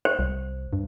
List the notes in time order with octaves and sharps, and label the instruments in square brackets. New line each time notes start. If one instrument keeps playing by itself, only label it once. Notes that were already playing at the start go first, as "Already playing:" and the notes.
[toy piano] C5
[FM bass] C2
G2